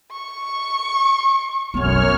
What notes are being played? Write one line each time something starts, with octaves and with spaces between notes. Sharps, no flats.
C#6
B1 F#2 B3 C#5 F6